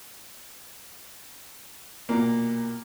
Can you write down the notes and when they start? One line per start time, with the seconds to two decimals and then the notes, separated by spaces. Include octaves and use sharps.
2.09 B1 A#2 A#3